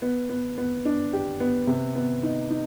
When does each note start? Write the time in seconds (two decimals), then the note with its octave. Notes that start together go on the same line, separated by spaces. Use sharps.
0.02 B3
0.29 B3
0.58 B3
0.85 D4
1.13 G4
1.40 B3
1.67 C3
1.95 B3
2.23 D#4
2.50 D#4